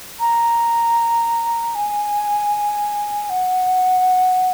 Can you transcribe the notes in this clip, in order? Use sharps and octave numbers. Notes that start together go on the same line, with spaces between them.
A#5
G#5
F#5